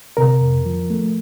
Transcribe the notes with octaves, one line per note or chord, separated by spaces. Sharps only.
C3 A#4
F2
F3
A3